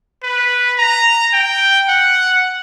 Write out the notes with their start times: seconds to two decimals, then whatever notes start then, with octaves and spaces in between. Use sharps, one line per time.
0.23 B4
0.78 A#5
1.33 G5
1.88 F#5